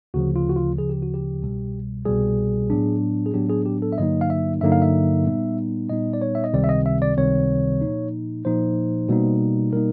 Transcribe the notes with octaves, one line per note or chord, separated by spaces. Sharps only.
D2 C#3 F3 F#4
F4
F#4
F4
D2 C#3 F3 G#4
G4
F#4
G4
C2 B2 G3
C2 B2 G3 G#4
A2 F#3 B3 D4
G#4
A2 F#3 B3 D4 G4
G#4
G4
A4
E5
G2 D3 F#3 A#3 D#4 D#5
F5
E5
G2 D3 F#3 A#3 D#4 E5
F5
E5
A#2 G3 B3 D#4
A#2 G3 B3 D#4 D#5
D5
C#5
E5
D#5
C#2 C3 D#3 G3 C4 D5
E5
D#5
E5
D5
C#2 C3 D#3 G3 C4 C#5
A#2 F3 A#3 D#4
A#2 F3 A#3 D#4 C5
B2 G3 A#3 D#4
B2 G3 A#3 D#4 A#4